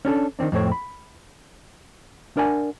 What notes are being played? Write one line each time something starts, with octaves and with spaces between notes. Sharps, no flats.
C#4 D4 G#4 A4
D#3 E3 C4 D4
F2 A2 C4 C#5
B5
D4 A#4 D5 F#5 G#5